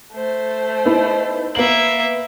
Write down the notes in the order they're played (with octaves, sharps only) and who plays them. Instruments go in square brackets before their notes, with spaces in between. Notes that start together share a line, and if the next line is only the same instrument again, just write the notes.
[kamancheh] A3 C5
[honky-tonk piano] B3 D#4 E4
[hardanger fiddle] A#3 E5 [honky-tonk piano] B3 F#7